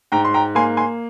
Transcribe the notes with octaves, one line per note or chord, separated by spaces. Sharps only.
G#2 G5 A#5
C6
G5 A#5
A#3 G#5 C6
G#5 C6